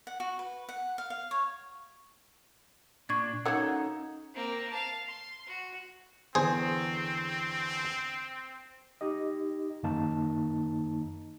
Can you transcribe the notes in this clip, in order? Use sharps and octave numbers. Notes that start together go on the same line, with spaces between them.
F#5
F#4
B4
F#5
F5
F5
C#5
A#2 D4 C#6 G#6 A6
F#3 A#3 C#4 D#4 A4 F#5 E6 G#6
A#3 C4
F5 A5
C6
F#4
E2 D3 C4 G#4 C5
D#4 G4 D#5
F#2 D#3 A#3 D#4 A5